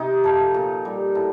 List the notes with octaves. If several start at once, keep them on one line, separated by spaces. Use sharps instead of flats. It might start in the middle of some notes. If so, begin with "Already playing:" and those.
Already playing: C3 D#4
F3 A3
A#2
G3
A2